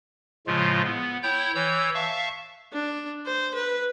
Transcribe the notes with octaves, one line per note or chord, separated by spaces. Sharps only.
A2 C#3 F3 G#3 F4
B3
E4 C#5 G5 G6
E3 C#5 E6 G6
E5 F5 A5 C#6
D4
C5
B4